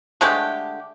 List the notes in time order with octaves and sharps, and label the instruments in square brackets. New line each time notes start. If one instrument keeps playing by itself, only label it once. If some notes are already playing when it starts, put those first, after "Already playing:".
[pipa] D3 G#3 A3 G4